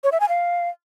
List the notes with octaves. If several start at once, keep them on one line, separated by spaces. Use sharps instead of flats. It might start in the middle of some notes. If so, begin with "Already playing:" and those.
C#5
E5
G#5
F5